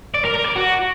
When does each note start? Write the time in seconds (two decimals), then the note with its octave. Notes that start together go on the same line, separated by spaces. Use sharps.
0.14 D5
0.25 A#4
0.35 A#4
0.45 D5
0.56 F#4